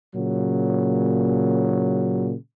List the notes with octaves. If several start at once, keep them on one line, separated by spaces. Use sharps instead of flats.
A#2 C#3 F#3